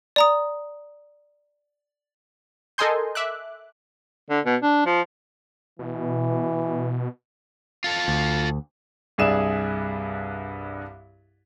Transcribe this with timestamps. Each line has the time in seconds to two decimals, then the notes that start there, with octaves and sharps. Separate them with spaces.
0.16 D5 A#5 D#6
2.78 A4 A#4 D#5 G#5 C6 G6
3.15 E5 D6 F#6
4.30 D3
4.45 B2
4.63 D4
4.86 F3
5.79 B2 E3
7.84 F4 A4
8.08 D2
9.18 C2 G2 G#4 D5 E5 E7